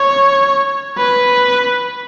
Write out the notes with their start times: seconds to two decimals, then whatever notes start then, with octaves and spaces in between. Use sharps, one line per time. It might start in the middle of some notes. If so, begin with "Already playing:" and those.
Already playing: C#5
0.98 B4